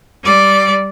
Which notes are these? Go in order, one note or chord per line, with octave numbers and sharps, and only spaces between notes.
G3 D5